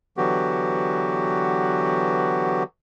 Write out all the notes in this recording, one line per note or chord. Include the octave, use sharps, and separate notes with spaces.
D3 E3 F#3 B3 F#4 G4